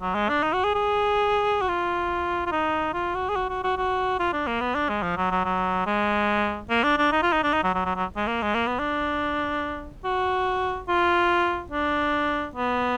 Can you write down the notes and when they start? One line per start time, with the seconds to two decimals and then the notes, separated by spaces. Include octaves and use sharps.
0.02 F#3
0.15 G#3
0.29 D4
0.43 D#4
0.53 F#4
0.64 G#4
0.74 G#4
1.61 F#4
1.69 F4
2.46 F4
2.52 D#4
2.94 F4
3.15 F#4
3.29 G#4
3.36 F#4
3.50 F#4
3.64 F#4
3.78 F#4
4.20 F4
4.33 D4
4.47 A#3
4.61 B3
4.75 D4
4.89 G#3
5.03 F3
5.17 F#3
5.31 F#3
5.45 F#3
5.87 G#3
6.70 A#3
6.84 D4
6.98 D4
7.12 D#4
7.23 F4
7.33 D#4
7.43 D4
7.54 D#4
7.64 F#3
7.75 F#3
7.85 F#3
7.96 F#3
8.17 G#3
8.27 A#3
8.42 G#3
8.55 A#3
8.67 B3
8.79 D4
10.05 F#4
10.88 F4
11.72 D4
12.56 B3